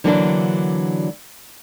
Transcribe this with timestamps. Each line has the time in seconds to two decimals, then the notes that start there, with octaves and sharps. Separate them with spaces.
0.04 D3 E3 F#3 A#3 C4 D4